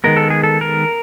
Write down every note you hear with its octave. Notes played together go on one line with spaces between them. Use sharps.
D#3 G#3 B3 A#4
A4
G#4
A4
A#4